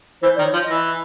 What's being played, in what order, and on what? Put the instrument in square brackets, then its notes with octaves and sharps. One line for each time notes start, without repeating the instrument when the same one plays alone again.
[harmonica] E3 [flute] C5
[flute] D5
[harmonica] D#3
[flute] C#5
[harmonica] F3
[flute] D#5
[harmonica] E3